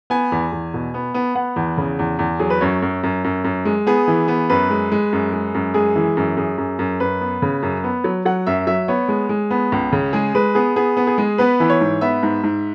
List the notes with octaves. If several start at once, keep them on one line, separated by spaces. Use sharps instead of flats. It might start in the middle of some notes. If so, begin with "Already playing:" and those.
B3 G#5
E2
E2
B2
B3
B3
B3 F#5
E2
C#3
E2
E2
F#3 G#4
B4
F#2 C#5
F#2
F#2
F#2
F#2
G#3
B3 G#4
E3
B3
F#2 B4
G#3
G#3
F#2
G#3
F#2
G#3 G#4
E3
F#2
F#2 G#4
F#2
F#2
F#2 B4
B3
C#3
F#2
B3
F#3
F#3 F#5
F#2 E5
F#3 E5
B3 C#5
G#3
G#3
B3
C#2
C#3
G#3 G#4
G#3 B4
B3 G#4
B3 G#4
B3
G#4
G#3
B3 B4
E3
C#5
G#2
B3 E5
G#2
G#2